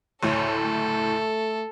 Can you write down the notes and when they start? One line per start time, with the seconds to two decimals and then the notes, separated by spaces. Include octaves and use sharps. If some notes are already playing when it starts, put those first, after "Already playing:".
0.23 F#1 D2 A2 A4 C#5
0.65 A3